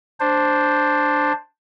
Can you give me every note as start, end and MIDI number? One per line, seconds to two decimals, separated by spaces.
0.20 1.32 62
0.20 1.32 72